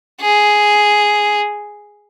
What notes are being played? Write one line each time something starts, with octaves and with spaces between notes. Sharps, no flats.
G#4